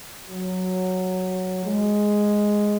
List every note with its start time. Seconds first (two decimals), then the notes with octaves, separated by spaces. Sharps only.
0.28 F#3
1.64 G#3